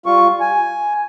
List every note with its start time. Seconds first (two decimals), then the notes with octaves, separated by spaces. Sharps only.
0.06 G3 F4 C#6
0.41 G#5